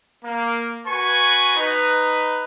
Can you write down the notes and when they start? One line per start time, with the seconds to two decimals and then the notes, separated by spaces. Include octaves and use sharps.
0.24 A#3
0.87 F#4 B4 G#5 C#6
1.57 D#4 B4